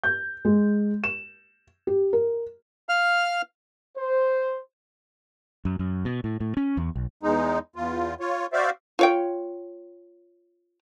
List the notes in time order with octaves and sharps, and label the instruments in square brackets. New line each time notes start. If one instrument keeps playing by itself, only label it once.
[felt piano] G6
G#3
E7
G4
A#4
[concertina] F5 F6
[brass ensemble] C5
[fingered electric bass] F#2
F#2
B2
A2
A2
C#4
E2
B1
[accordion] E2 G#3 D#4
E2 F4
F4 C#5
F#4 C5 D5 E5 F5
[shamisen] F4 C#5 G5